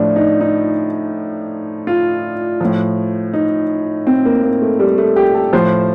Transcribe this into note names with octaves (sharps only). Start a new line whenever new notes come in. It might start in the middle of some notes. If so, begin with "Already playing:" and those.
Already playing: A2 F3 D4
D#4
D#4
F4
A2 F3
D#4
C4
A#3
A#3
A3
G3
A3
G4
A4
A2 F3 C5